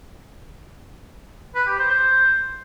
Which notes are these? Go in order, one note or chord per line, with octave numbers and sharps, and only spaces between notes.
B4
G4
C5
C5